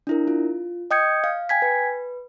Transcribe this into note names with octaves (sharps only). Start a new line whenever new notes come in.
D4 E4 A#4
F4
D#5 G5 D#6 G6 G#6 C#7
F5
G5 G#5 G#6 B6
B4